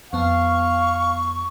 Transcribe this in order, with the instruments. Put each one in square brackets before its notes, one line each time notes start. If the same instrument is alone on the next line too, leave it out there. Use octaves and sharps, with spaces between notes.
[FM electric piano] F2 B3 A5 [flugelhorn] F5 [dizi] C#6